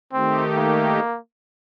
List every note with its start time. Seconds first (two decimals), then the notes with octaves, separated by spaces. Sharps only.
0.13 D#3 A3 C4 D#4 G4
0.57 A#3